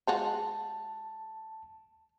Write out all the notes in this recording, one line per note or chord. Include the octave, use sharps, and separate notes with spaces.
G#3 F4 F#4 A5